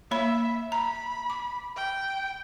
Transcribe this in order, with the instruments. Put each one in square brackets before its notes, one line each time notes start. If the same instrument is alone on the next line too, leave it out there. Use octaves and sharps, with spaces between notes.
[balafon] A#3 C#5 B5 [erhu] E5
[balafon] A#5 [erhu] B5
[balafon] D6
[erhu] G5